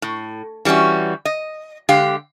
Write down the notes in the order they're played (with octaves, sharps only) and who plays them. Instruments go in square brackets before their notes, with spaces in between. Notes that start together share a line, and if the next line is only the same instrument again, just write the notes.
[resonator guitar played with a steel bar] A2
E3 G3 A3 C#4 F#4
D#5
D3 G#3 G4 F5